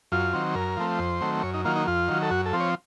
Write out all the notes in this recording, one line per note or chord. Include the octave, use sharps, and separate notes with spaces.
F#2 F4
D#3 F#3 C4
F#2 A#4
F3 A3 C4
F2 C5
D#3 F#3 A3 C4
F#2 C#5
D#4
D#3 F#3 A#3 F4
D#4
F2 F4
D#3 F#3
A4
F#2 F#4
A4
F3 C4
C#5